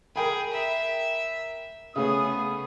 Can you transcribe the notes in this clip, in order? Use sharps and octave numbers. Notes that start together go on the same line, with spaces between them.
G#4 A#4 G5 B5
E5
C#3 A3 B3 C#4 G#4 D#6